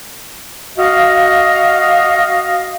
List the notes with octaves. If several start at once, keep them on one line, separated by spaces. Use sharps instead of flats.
F#4 D#5 F5